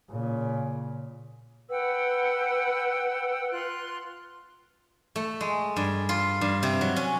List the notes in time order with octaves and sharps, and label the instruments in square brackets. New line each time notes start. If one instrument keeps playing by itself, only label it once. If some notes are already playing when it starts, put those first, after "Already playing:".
[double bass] A#2 C#3
[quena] B4 [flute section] F#5 G5 E6
[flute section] F4 C6 F#6
[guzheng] A3
G#3
G2
F4
G2
C3
F#3
C#4